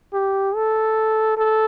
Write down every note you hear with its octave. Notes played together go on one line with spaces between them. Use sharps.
G4
A4
A4